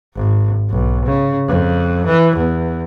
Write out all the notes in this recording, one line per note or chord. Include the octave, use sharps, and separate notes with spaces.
G#1
B1
C#3
F2
E3
E2